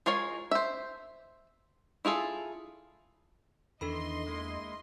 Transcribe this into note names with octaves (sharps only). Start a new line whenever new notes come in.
G#3 F4 A#4 C#5 G#5
C5 E5
E4 F4 G#4 A4
E2 D#3 E3 D4 A4 D#5 B5 C6
G#3 A#3 E4